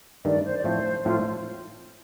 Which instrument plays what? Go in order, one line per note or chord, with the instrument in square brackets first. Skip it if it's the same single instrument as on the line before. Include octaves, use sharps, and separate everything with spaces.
[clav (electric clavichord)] G2 D#3 A3 [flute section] D5
[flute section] C5
D5
[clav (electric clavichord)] A2 F3 A3 C4 [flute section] C5
[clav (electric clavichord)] A2 F3 A3 C4 [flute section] F4